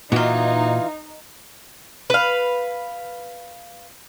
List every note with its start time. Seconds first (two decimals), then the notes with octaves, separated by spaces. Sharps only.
0.12 A#2 E3 D#4 F4 F#4
2.10 B4 F5